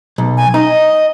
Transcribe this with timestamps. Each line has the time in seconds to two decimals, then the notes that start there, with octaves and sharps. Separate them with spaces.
0.18 B1
0.37 G#5
0.54 D#4 D#5